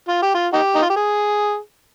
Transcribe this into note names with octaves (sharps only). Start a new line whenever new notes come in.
F4
G4
F4
D#4 G4
D#4
F4
G4
G#4